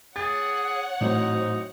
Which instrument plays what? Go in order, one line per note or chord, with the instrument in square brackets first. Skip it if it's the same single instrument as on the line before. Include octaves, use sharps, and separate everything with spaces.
[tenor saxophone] G#4 [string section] C#5 F#5 [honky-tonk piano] A6
[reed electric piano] A2 [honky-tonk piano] E3 F#3 C4 [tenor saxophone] D#4